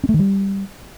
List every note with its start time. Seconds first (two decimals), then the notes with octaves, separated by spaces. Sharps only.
0.04 C#4
0.09 A3
0.14 D#3
0.19 G3